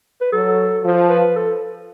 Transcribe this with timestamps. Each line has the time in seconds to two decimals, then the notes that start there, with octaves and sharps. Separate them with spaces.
0.21 B4
0.32 F#3 A4
0.84 F3
1.09 B4
1.36 A4